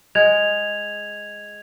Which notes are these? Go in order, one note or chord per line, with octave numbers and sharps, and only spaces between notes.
G#3 G#6 F7